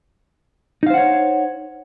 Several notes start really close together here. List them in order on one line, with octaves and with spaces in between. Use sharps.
D#4 F5 C5 F#5 C#5